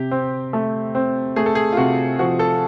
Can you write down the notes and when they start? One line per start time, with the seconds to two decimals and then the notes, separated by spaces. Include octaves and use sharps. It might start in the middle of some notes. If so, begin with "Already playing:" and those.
Already playing: C3 G4
0.11 C4
0.53 A3
0.95 C4
1.36 A3 G#4
1.46 A4
1.55 G#4
1.73 F4
1.77 C3 F#4
2.19 F3 F#4
2.39 A4